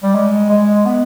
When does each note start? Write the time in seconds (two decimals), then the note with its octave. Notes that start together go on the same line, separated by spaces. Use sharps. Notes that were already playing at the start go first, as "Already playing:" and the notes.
0.03 G3
0.15 G#3
0.50 G#3
0.85 B3